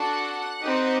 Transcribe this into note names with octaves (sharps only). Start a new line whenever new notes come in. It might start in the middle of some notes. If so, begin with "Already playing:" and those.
Already playing: D4 F#4 A4 F#5
C4 D#4 G4